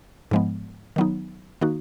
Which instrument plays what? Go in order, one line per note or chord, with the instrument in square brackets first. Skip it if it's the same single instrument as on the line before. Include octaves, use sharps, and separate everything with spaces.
[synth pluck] G#2 F3 G#3 B3
D#3 F#3 B3 D#4
D#3 A#3 D#4 F#4